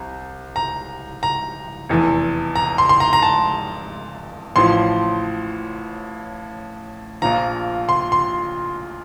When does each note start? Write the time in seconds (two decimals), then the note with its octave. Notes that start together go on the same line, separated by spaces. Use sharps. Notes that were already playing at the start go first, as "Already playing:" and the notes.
Already playing: C2 C3
0.56 A#5
1.23 A#5
1.89 F1 E2 E3
2.56 A#5
2.78 C6
2.89 C6
3.00 A#5
3.13 A#5
3.22 A5
4.56 A1 A2 F3 C6
7.22 A#1 A#2 F3 A#5
7.89 C6
8.12 C6